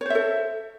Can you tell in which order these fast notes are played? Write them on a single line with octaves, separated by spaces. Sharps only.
C#5 C5 E5 A4